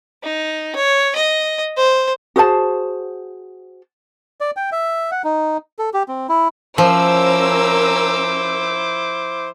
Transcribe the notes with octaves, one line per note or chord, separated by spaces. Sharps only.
D#4
C#5
D#5
C5
F#4 G#4 C5 A5
D5
G5
E5
F#5
D#4
A4
G4
C4
E4
F3 C#4 E4 A#4 C5 D6 E6